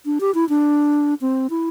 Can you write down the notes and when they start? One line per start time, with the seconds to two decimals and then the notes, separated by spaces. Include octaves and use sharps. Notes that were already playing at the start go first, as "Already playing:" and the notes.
0.06 D4
0.21 G4
0.35 E4
0.49 D4
1.21 C4
1.50 E4